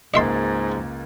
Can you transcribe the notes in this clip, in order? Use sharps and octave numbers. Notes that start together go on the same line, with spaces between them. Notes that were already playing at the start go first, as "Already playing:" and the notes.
C#2 G#2 A#3 D#5 E5 C6 A6